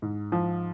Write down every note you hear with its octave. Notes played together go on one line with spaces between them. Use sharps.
G#2
F3